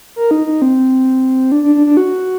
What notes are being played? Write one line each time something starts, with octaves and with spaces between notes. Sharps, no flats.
A#4
D#4
D#4
C4
D4
D4
D4
D4
F#4